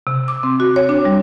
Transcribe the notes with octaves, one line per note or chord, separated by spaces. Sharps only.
C3
D6
C4
F#4
C#5
D4
G3